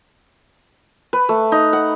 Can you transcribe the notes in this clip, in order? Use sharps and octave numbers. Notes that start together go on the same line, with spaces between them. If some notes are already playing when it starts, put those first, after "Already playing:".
B4
A3
D#4
F#5